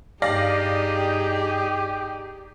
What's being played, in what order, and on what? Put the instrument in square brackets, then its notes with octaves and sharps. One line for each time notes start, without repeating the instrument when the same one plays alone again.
[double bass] G2 [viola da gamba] D#4 G#4 [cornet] G4 [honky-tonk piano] D5 F5 A#6